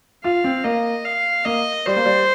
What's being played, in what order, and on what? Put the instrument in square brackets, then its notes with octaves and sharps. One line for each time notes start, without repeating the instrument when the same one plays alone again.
[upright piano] F4 [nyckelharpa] F5
[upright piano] C4
[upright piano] A#3 [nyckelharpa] D#5
[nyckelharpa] F5
[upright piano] A#3 [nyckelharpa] D#5
[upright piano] G3 [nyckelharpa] C5
[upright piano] A#3
G3